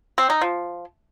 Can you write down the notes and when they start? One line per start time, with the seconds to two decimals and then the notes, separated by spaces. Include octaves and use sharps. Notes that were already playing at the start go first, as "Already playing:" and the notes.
0.18 C4
0.30 D#4
0.41 F3